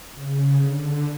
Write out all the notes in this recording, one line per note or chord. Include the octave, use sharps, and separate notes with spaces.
C#3
D3